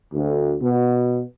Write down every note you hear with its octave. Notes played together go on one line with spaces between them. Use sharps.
D2
B2